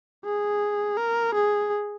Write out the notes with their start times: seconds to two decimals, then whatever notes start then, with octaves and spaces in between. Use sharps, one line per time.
0.25 G#4
0.97 A#4
1.35 G#4